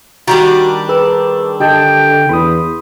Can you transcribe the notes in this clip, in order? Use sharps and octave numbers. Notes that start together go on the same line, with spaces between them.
D#3 G3 D4 F#4 G4
G#4 B4 E6
D3 G4 D#5 G5 A5
E2 B5 C6 D#6